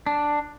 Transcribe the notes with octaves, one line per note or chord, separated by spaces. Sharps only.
D4